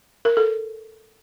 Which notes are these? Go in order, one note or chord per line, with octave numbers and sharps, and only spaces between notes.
A#4
A4